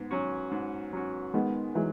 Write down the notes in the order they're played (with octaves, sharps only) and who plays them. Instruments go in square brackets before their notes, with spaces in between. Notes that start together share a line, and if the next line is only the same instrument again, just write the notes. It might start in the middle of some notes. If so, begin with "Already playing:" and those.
Already playing: [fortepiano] G#2 [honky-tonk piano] B3
[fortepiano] F#3 C#4 F#4
G#2
F#3 C#4 F#4
[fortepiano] D#3 [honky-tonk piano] G#3 B3
[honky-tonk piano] E3 G#3 [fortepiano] F#3